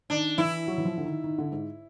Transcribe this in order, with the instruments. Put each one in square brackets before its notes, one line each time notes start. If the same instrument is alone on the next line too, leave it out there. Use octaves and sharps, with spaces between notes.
[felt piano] D#3 [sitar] D4
[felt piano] E3 [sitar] E4
[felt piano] F#3
E3
F3
D3
D#3
D#3
D3
G#2